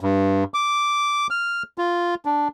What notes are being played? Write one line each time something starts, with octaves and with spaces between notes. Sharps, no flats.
G2
D6
F6
F4
D4